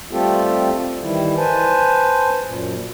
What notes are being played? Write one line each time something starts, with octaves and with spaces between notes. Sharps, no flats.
G3 A3 C4 F4 G4 A4
D#3 E3 G3 E4
B4 C5 G#5 A5
F#2 A#2